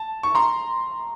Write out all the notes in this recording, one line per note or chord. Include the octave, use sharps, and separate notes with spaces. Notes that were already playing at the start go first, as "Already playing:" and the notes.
Already playing: A5
C#6
A#5 C6